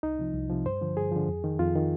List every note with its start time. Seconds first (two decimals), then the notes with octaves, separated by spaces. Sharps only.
0.03 C2 D#4
0.19 C3 F3
0.34 C2
0.49 C3 F3
0.65 G2 C5
0.81 D3 F3
0.96 G2 G#4
1.12 D3 F3
1.29 F2
1.44 D#3
1.59 F2 F4
1.75 D#3